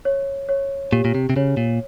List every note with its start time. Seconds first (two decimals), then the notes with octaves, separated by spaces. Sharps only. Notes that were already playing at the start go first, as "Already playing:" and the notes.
0.05 C#5
0.49 C#5
0.92 A#2 G4
1.05 A#2
1.15 C3
1.30 C3
1.36 C#3 C#5
1.57 A#2